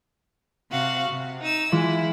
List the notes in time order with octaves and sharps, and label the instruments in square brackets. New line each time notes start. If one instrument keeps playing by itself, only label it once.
[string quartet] C3 F#4 F5
C3
D#4 E6
[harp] E3 G#3 F4 [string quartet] E4